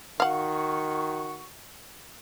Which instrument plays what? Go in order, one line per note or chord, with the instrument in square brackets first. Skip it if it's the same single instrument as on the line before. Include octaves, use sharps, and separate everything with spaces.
[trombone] D#3 [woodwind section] F#4 C#6 [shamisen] F5 F#5